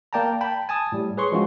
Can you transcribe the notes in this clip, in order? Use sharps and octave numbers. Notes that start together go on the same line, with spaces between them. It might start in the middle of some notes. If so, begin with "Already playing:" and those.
A#3 D5 G5 A5 A#5
G5 A5 B5
G#5 A5 D#6
A2 G3
G#4 B4 C#5 C6 C#6
F3 G#3 C#4 F4 F#4